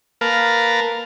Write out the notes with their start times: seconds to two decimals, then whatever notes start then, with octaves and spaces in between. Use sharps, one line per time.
0.21 A#3 A#4 B4 F5 A5